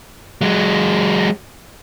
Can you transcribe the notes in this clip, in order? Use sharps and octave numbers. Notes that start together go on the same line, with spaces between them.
F#3 G#3